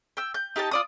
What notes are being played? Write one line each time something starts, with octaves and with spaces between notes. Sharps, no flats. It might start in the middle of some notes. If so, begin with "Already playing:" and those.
G5 E6
G6
D#4 G4 D#5 A5
F4 D5 D#6